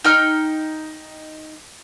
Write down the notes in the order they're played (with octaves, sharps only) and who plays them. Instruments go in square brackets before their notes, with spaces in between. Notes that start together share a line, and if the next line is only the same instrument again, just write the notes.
[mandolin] D#4 G5 F6